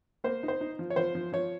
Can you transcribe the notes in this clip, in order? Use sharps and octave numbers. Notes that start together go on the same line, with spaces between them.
A#3 C5
D#4
C5
D#4
F3
C#5
F3 C5
F3
F3 C#5